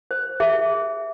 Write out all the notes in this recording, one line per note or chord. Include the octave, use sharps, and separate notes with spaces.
C5
G#4 E5